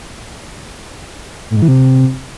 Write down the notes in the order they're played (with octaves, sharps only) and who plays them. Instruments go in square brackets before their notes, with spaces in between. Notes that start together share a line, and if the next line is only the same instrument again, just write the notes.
[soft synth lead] A2
G#2
E3
C3